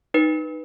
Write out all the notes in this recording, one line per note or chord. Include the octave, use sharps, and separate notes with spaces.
D#4 B4